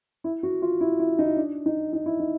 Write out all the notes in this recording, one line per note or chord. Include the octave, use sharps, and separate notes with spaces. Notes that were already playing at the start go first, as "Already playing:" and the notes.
E4
F#4
F4
E4
E4
D#4
D4
D#4
D#4
E4
D#4